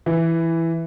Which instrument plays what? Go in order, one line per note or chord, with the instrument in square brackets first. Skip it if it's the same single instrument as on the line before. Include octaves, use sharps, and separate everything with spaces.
[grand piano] E3